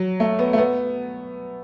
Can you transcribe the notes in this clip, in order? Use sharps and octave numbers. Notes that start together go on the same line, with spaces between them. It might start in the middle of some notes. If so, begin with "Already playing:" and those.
Already playing: F#3
A3
B3
A3
B3